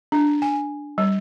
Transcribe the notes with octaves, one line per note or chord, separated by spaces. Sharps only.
D4
G#5
G3